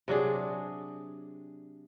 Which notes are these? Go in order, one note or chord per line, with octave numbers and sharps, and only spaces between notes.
C3 F#3 D4 G#4